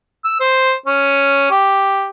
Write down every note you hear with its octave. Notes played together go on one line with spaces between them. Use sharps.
E6
C5
C#4
G4